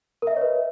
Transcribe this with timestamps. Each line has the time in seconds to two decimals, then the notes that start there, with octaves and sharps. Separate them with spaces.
0.22 A#4
0.27 E5
0.32 D#5
0.37 C#5
0.41 B4